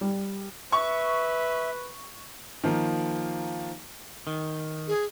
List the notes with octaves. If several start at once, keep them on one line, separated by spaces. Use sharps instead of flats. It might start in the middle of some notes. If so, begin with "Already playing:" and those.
G3
B4 E5 C#6
D#3 F3 A#3
D#3
G#4